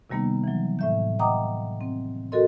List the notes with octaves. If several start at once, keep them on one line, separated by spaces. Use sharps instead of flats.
C3 D#3 G3 A#3 B3 D#4
E3 F#3
A2 E5 G6
D#5 F#5 G5 A#5 D6 D#6
C4
F#4 A4 A#4 D#5 C6